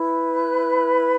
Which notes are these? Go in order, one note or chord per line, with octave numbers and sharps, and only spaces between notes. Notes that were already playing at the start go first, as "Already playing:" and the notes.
Already playing: E4 B4
F#6